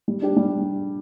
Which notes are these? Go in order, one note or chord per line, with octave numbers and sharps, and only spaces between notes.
G3
D4 G4
G3